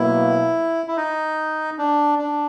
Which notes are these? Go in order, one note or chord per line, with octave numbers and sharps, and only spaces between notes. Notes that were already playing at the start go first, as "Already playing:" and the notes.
Already playing: B2 F#3 A#3 E4
E4
D#4
D4
D4